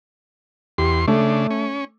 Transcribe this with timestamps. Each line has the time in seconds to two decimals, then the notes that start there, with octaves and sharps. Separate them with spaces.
0.78 E2 G4 C6
1.08 C#3 A3 D4
1.51 C#4